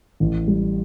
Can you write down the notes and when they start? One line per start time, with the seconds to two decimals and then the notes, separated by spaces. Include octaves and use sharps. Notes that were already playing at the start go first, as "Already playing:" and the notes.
0.20 A1
0.48 G3